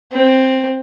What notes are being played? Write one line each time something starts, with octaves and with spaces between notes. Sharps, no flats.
C4